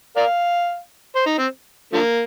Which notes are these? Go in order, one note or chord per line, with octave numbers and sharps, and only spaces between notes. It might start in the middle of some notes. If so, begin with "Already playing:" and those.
A#4 D5 F5
C5
D#4
C4
D3 F3 A#3